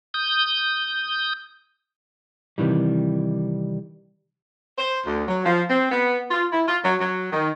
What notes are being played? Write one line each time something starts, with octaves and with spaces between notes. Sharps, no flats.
D#6 G6
C3 D#3 E3 G3
C5
D2
F#3
F3
C4
B3
F4
E4
F4
F#3
F#3
D#3